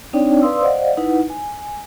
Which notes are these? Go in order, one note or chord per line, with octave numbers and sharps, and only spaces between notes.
C4 D4 D#4 C#5 D5 G5
B4 D5 F5 C6 D#6 E6
C5 D5 D#5 F5 F#5
D#4 E4 B4 F#5
G#5